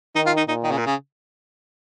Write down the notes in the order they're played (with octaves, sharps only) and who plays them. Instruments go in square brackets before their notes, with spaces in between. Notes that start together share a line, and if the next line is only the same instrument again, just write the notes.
[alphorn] D#3 [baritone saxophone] D#4
[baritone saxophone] F4
D#4
[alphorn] A#2 [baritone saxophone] D#4
[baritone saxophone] D#3
C#3
A#2
C#3